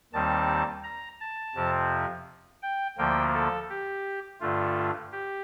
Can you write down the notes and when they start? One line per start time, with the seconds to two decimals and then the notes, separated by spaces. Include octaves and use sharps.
0.13 D#2 D#3 G3 C4 A5
0.84 A#5
1.20 A5
1.55 F2 C3 F3 C4
2.62 G5
2.98 D2 D3 F3 A#3 G5
3.34 A4
3.70 G4
4.40 G2 D3 A3 F4
5.12 G4